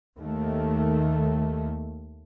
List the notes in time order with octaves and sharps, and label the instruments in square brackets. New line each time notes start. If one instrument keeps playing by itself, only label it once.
[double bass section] D#2 D#3 A3